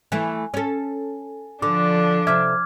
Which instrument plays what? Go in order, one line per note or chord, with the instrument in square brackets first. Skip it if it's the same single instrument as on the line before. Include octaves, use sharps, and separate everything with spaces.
[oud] E3 A3 E4 [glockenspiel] G#5
[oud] C#4 A4
[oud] D3 [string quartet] F3 D4 [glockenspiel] D6
[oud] C3 E5 [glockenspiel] D6 F6 G#6